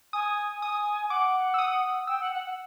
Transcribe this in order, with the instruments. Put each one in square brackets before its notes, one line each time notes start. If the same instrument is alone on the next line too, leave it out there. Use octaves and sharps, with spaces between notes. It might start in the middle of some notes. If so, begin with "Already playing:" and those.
[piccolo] G#5 [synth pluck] D#6
[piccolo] G#5 [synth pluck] D#6
[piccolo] F#5 [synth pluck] D6
[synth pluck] E6
D#6
[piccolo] G5 [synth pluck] E6
[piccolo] F#5
F#5
F#5